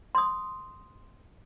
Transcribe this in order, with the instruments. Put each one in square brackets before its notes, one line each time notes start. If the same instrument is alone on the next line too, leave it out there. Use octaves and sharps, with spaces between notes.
[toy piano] C6 D#6